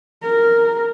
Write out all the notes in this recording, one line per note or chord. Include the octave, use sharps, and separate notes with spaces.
A#4